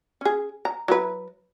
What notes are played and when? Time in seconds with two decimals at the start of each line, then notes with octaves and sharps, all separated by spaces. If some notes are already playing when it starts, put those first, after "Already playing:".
0.21 C#4 G#4
0.65 A#5
0.88 F#3 E4 B4